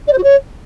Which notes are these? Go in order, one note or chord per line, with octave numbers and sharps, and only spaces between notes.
D5
C5
F#4
C#5